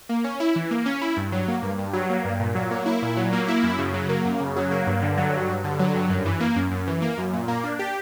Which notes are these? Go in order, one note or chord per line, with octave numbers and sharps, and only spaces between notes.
A#3
C#4
E4
E3
A#3
C#4
E4
G2
F#3
A#3
G2
G2
F#3
A#3
G2
A#2
F#3
A#3
E4
A#2
F#3
A#3
E4
F#2
C#3
F#3
A#3
F#2
C#3
F#3
A#3
G2
D3
F#3
G2
G2
D3
F#3
G2
F#2
E3
A#3
F#2
F#2
E3
A#3
F#2
A#2
A#3
D4
G4